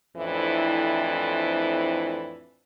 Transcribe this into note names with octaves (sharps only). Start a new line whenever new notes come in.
F2 A2 E3 C4 D4 E4